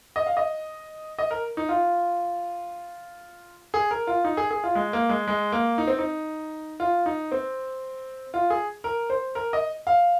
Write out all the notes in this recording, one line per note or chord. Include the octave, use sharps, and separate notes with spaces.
D#5
F5
D#5
D#5
A#4
D#4
F4
G#4
A#4
F4
D#4
G#4
G#4
F4
G#3
A#3
G#3
G#3
A#3
D#4
C4
D#4
F4
D#4
C4
F4
G#4
A#4
C5
A#4
D#5
F5